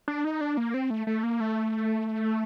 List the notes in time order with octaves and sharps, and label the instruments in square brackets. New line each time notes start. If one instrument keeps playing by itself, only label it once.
[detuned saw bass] D4
D#4
D4
A#3
C4
A3
A3
A#3
A3